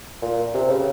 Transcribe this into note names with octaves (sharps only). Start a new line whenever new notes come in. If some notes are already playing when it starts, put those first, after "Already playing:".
A#2
C3
C#3